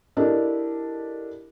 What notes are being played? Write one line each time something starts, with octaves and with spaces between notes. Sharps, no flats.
D4 E4 G4 A4 A#4 D#5